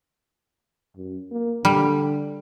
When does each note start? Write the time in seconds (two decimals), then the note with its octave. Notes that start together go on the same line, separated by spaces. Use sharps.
0.97 F#2
1.31 A#3
1.65 D3 G3